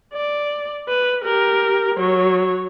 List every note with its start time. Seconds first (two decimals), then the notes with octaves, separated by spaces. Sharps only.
0.14 D5
0.88 B4
1.24 G4 A#4
1.95 F#3 C#5